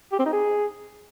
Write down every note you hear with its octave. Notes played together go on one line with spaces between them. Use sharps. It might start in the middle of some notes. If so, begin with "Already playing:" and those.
G4
C4
D#4
G#4